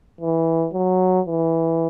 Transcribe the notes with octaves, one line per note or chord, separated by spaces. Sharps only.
E3
F#3
E3